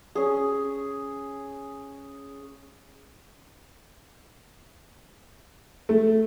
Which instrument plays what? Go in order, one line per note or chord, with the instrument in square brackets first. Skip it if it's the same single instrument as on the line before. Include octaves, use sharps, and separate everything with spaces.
[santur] C#4 G#4
[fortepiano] A3